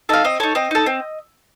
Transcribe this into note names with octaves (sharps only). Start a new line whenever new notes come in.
D#4 A4 F5
C4 D#5
D#4 A4 C#5
C4 D#5
D#4 A4
C4